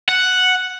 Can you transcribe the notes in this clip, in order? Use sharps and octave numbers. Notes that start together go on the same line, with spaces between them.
F#5